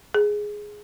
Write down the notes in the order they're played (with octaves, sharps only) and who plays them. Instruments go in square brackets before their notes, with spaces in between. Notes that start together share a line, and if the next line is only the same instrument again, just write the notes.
[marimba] G#4